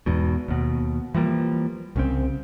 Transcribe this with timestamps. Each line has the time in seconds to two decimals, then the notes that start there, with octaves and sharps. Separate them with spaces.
0.06 E2 G#2 B2
0.48 D#2 B2
1.15 E3 F3 G3 A#3
1.96 C2 C#3 C4